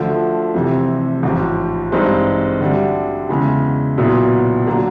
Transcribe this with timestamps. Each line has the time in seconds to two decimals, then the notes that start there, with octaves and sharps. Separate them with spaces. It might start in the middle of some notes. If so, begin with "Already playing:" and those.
Already playing: D2 D3 F3 A3
0.54 F1 F2 C3 E3
1.23 A1 G#2 F3
1.92 G2 E3 G#3 C4 D#4
2.60 D2 D3 G3
3.29 E2 C#3 E3 G#3
3.98 B1 A#2 F#3 B3 E4
4.66 D3 F#3 A#3